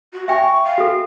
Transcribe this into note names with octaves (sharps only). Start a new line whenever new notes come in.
F#4
E5 G5 G#5 C#6
F5
F#4 A4